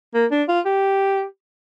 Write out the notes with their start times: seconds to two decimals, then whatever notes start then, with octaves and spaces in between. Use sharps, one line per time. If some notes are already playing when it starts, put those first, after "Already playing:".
0.14 A#3
0.31 D4
0.48 F4
0.65 G4